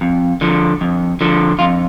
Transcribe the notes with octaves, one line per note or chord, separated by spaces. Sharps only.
F2
D3 F3
F2
D3 F3
F2 F4